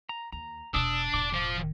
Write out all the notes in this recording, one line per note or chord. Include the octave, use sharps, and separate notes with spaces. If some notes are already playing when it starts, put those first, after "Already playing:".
A#5
D#2 A#5
E1 B2 D4 D#6 E6
E1 A2 D6
F3